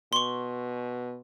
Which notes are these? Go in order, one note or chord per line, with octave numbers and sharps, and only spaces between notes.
B2 C6 C#6